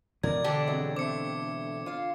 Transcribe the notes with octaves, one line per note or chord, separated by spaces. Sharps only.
B2 E3 B3 A#4 D5 G#6
D3 D4 G4
F2 F#3 G#3
A3 C4 D6 C#7
F4 F5